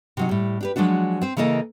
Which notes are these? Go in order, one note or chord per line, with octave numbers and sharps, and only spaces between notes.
C3 F#3 D#4
A2 G3
D4 G4 B4
F3 F#3 G#3 D4 F#4
C4 C5
C#3 E3 A#3 A4 D#5